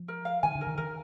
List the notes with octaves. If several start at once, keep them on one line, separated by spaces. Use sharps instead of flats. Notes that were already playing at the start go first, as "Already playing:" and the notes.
Already playing: F3
A#4
F5
D#3 G#5
D3
A#4
D#3
D#3 A#4